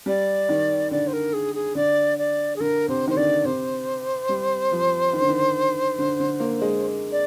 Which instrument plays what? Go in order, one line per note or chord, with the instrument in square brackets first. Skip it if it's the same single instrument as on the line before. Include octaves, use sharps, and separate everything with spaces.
[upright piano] G3 [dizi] D5
[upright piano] D#3
[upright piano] D3 [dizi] D5
[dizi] C5
A#4
G#4
G#4
[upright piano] D3 [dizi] D5
[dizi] D5
G#4
[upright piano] D3 [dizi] A#4
[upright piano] C3 [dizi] C5
[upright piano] D#3 [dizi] C5
[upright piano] D3 [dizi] D5
[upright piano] C3 [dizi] C5
[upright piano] G3
F3
D#3
D3
D#3
D3
D3
A#3
G#3
[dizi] D5